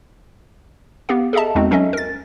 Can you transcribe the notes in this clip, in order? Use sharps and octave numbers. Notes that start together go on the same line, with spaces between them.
B3 G4 F5
G#4 A4 D#5 E5 A5
E2 G#3 C4 D#4 F#4
F#3 C#4 A4 D#5 E5
A#4 A6